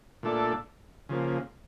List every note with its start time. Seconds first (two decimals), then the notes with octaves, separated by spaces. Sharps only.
0.23 A#2 A3 D4 A4 D5
1.09 C#3 F3 A#3